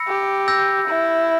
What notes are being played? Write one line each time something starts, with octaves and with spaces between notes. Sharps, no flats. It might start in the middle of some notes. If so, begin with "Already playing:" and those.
Already playing: B5 E6 A#6 C#7
G4
E6 G6 A#6
E4